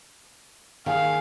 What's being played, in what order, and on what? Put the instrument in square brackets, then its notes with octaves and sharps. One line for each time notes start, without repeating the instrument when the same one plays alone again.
[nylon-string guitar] D#3 [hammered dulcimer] A#3 G#4 [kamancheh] F5